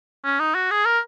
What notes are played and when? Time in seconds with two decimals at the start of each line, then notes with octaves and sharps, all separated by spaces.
0.24 C#4
0.39 D#4
0.54 F#4
0.71 G#4
0.85 A#4